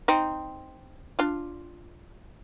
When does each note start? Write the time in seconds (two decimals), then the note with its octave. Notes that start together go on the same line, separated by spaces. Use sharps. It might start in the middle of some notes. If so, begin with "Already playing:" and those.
0.08 C4 D#4
1.19 D4 F4